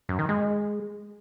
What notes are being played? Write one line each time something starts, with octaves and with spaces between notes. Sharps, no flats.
F#2
D#3
G#3